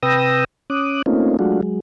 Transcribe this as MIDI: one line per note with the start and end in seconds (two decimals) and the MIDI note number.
0.03 0.44 48
0.03 0.44 71
0.03 0.44 79
0.03 0.44 87
0.03 0.44 88
0.03 0.44 94
0.70 1.02 61
0.70 1.02 86
0.70 1.02 87
0.70 1.02 90
1.06 1.37 57
1.06 1.37 58
1.06 1.37 60
1.06 1.37 61
1.06 1.37 63
1.06 1.37 65
1.39 1.61 54
1.39 1.61 56
1.39 1.61 57
1.39 1.61 62
1.39 1.61 65
1.39 1.61 66
1.63 1.80 54
1.63 1.80 56